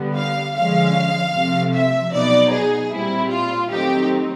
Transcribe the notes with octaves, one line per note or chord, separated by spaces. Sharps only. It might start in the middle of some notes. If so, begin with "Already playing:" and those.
Already playing: D3 G3 B3
F5
D3 F3 G#3 C#4 F5
C3 F3 A3
E5
B2 F#3 B3 D#4 D5
G#4
A#2 G3 C4 E4
F4
D#3 F#3 A3 C4 D#4 G4